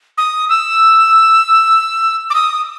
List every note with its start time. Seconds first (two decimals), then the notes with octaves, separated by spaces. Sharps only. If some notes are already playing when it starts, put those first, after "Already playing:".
0.18 D#6
0.49 E6
2.30 D6
2.35 D#6